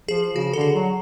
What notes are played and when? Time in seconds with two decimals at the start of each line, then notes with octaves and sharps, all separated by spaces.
0.08 F3 G#4
0.35 C#3 F#4
0.53 D3 A4
0.61 G#4
0.74 F#3